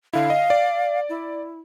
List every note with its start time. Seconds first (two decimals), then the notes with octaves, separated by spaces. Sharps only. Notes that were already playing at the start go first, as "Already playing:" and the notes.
0.13 D3 E4 F5
0.30 D#5
0.50 D5
1.09 E4